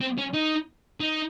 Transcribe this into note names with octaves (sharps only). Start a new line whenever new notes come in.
C4
C#4
D#4
D#4